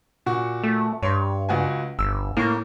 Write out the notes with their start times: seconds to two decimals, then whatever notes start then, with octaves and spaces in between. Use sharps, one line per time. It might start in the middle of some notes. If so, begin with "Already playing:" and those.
0.26 A#2 F#4 C#6
0.63 A3
1.02 G2 C#5 C6
1.49 C#2 F#4 G#5
1.99 G1 E6
2.37 A2 A#3 C#6